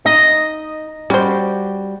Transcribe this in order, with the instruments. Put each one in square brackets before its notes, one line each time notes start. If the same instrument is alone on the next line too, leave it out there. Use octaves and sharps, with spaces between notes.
[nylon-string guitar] D#4 [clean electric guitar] D#5
[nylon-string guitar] G3 F#4 G4 [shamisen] C#4 C5